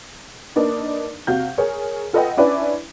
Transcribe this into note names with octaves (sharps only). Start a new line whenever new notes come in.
A#3 D4 D#4 B4
C3 F#4 F5 G6
G#4 A#4 C#5
F4 A4 B4 D#5 F#5 G5
C#4 D4 E4 B4 D5